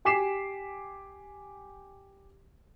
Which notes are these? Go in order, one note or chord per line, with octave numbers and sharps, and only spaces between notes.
G4 G#5 D6 B6 C7 E7